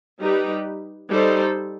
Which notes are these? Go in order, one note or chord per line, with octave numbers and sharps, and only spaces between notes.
G3 D#4 G4 B4
G3 D#4 A4 C5